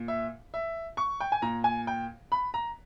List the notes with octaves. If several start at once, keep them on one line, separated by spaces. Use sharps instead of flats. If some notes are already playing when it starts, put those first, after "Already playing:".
Already playing: A#2
E5
E5
C#6
G5
G#5
A#2 A#5
G#5
G5
B5
A#5